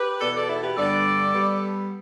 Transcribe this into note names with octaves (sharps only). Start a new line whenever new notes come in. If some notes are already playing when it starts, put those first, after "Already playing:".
Already playing: G4 B4
E2 B2 B3 A4 D5
A4 D5
E4 A4
G4 B4
G2 D3 B3 A4 D5
G3 B3